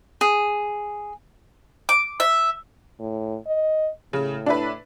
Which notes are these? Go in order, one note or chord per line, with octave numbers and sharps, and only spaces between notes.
G#4
D6
E5
A2
D#5
A2 C#3
D4 E4 B4